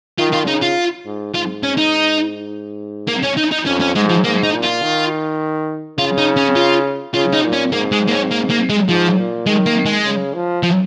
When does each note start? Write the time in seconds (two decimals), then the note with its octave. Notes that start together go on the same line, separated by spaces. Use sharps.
0.18 D#3 F4
0.33 F4
0.47 C#3 D#4
0.62 F4
1.05 G#2
1.34 G#2 F4
1.63 C#4
1.78 D#4
3.08 A#3
3.23 C#4
3.38 D#4
3.52 D#4
3.66 F2 C#4
3.81 C#4
3.95 G#2 G#3
4.10 F3
4.24 G#2 A#3
4.43 D#4
4.53 A#2
4.63 F4
4.83 D#3
5.99 C#3 F4
6.18 D#4
6.37 C#4
6.56 F4
7.14 C#3 F4
7.33 D#4
7.44 A#2
7.53 C#4
7.73 G#2 A#3
7.92 G#3
8.08 A#3
8.11 C#4
8.31 A#3
8.50 A#3
8.70 G#3
8.89 G#2 F3
9.18 A#2
9.46 D#3 G#3
9.66 A#3
9.86 G#3
10.05 C#3
10.34 F3
10.63 F3